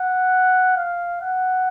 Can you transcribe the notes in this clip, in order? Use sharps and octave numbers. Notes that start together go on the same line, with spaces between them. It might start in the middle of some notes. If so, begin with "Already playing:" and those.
Already playing: F#5
F5
F#5